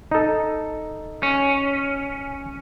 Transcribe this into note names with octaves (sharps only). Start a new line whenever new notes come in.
D#4 A4
C#4